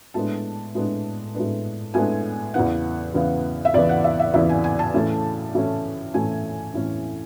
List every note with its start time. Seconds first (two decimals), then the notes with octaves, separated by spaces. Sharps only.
0.14 A2 G#3 B3 D4 A5
0.75 A2 G#3 B3 D4
1.35 A2 G#3 B3 D4
1.94 A2 G#3 B3 D4 G#5
2.54 E2 C#3 E3 B3 F#5
3.14 E2 C#3 E3 B3
3.65 E5
3.74 E2 C#3 E3 B3 D5
3.89 F#5
4.04 E5
4.19 E5
4.34 E2 C#3 E3 B3 E5
4.49 G#5
4.64 G#5
4.79 A5
4.94 A2 E3 A3 C#4
5.55 A2 E3 A3 C#4
6.14 A2 E3 A3 C#4 G#5
6.74 A2 E3 A3 C#4